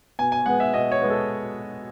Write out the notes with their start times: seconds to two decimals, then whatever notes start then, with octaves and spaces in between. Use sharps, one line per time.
0.19 B2 G#5
0.32 G#5
0.46 G#3 B3 F#5
0.60 E5
0.74 B2 D#5
0.92 C#5
1.02 G#3 B3
1.10 A4